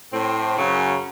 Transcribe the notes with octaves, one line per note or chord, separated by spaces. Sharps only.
A2 C4
F#2 C#3 F#3